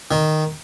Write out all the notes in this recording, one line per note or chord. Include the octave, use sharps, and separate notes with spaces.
D#3